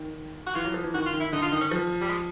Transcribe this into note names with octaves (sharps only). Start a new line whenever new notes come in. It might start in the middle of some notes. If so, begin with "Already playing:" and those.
Already playing: D#3
F#4
E3 F4
F#3
F3
E3
D#3 F#4
F4
D#3
E4
D3 D#4
F4
D#3 D#4
C#4
F3
G3
G#3